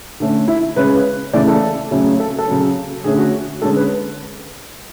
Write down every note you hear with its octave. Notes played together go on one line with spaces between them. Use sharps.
D3 A3 C#4
E4
C#3 G#3 C#4 B4
C#3 E3 A3 D5
A4
C#3 F#3 A3 C#4
A4
A4
C#3 F#3 C#4
D3 A3 C#4 G#4
F#4
D3 G#3 C#4 A4
B4